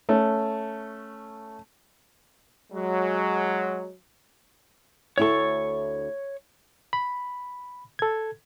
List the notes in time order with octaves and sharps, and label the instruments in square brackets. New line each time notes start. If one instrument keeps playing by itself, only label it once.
[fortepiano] A3 C#4
[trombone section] F#3 G#3
[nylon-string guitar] D2 E4 A4 [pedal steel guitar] C#5 C#6
[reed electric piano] B5
A4 G#6